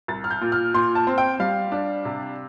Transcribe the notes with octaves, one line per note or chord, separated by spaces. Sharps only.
C2 A6
F6
G6
A#2
F6
A#2 C6
A5
C4
G5
G3 F5
D4
C3